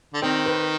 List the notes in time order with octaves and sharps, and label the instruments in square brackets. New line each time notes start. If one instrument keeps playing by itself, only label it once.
[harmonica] D3
[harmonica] D#3 [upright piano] C4
[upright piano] B4